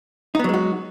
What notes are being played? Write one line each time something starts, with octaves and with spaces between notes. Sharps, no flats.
F#3 G#3 B3 D#4 F#4